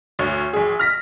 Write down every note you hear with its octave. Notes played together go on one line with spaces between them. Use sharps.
D2 C#5
A#1 G#4
F6 A#6 B6